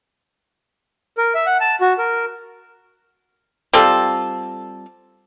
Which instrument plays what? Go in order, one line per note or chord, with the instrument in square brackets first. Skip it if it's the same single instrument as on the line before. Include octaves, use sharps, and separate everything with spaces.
[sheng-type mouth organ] A#4
E5
F#5
A5
F#4
A#4
[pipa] G3 C4 F4 A4